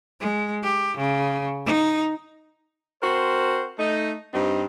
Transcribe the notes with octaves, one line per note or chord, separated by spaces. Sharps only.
G#3
G4
C#3
D#4
C4 F#4 A#4 C5
A3 D#4
G2 C4 D#4